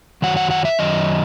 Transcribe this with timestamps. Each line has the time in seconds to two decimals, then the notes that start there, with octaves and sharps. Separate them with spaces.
0.22 F#2 D#3 F#3 F#5
0.37 F#5
0.51 F#5
0.65 E5
0.79 F#2 D#3 F#3 D#5